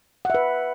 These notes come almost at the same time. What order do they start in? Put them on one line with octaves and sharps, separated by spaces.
F#5 E5 B4